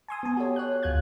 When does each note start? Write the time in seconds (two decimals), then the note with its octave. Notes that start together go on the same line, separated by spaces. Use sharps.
0.08 G#5 C6 D#6
0.23 B3 G#5
0.37 F#4 G4 A4 C#5
0.56 C#5 F#6
0.83 D2 F4 F#6 G#6